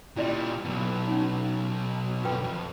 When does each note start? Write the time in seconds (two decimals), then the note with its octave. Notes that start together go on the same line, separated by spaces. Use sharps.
0.17 A#2 G3 E4 D5 D#5
0.65 B1 B2
1.08 C#4 D#4
2.25 F#2 D3 F4 B4 G5
2.43 F2